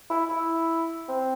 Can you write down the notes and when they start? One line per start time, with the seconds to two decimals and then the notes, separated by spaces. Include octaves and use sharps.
0.10 E4
0.30 E4
1.09 C4